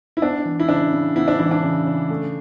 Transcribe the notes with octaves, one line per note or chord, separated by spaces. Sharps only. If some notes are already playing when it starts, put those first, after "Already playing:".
E4
B3 D4
E3
E4
C#3 D4
C#3
B3 E4
D4
E3 E4
D4
C#3
C#3
A3